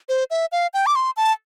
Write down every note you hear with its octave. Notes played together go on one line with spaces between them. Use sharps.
C5
E5
F5
G5
D6
C6
A5